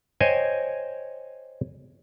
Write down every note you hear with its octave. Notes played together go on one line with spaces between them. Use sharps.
C5 C#5 D#5 G5 G#5